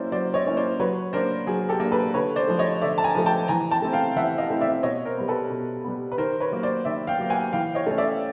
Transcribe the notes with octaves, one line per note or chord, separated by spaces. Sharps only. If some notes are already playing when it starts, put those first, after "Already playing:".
Already playing: F#3 A#3 C#4 E4 C5 D5
F#3 C5 D5
C#5 D#5
A#3 C#4 E4
C5 D5
F#3 B4 C#5
A#3 D4 A#4 C5
F#3 G#4
G4 A4
A#3 D4
A4 B4
D3 B4 C#5
C5 D5
F3 A3
C#5 D#5
D3 D5 E5
A5
G#5 A#5
F3 A3
G5 A5
E3 G#5 A#5
G5 A5
A3 C4 E4
F5 G5
E3 E5 F#5
D#5 F5
A3 C4 E4
D5 E5
B2 C#5 D#5
A#4 C5
G3 B3
A4 B4
B2
G3 B3
B4
D#3 A#4 C5
B4 C#5
F#3 A#3
C5 D5
D#3 D5 E5
F5 G5
F#3 A#3
F#5 G#5
E3 F5 G5
C#5 D#5
A3 C#4
D5 E5